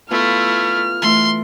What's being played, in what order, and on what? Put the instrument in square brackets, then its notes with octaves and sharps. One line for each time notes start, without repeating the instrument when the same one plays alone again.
[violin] A3 E4 [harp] B3 F4 [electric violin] F6
[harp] E3 A3 E4 [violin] C6